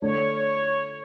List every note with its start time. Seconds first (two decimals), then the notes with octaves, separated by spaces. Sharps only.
0.02 D3 A3 D4 C#5